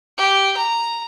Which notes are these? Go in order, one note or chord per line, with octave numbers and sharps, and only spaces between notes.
G4
A#5